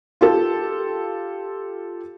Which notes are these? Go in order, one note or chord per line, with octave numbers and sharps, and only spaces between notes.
F4 G4 A4